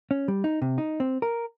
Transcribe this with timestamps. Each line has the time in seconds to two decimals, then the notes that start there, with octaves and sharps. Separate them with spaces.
0.11 C#4
0.28 G3
0.44 D#4
0.62 C3
0.78 D#4
1.00 C4
1.22 A#4